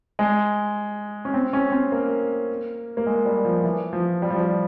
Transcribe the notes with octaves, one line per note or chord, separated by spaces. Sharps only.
G#3
C#4
C4
C#4
C4
A#3
A#3
G#3
G3
F3
E3
F3
G3
F3
G3